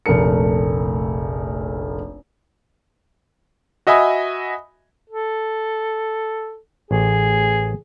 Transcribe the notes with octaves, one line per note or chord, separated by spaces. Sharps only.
F1 A#1 A3 A#4 C#7
F#4 D#5 E5 G#5 B5 D#6
A4
A1 G#4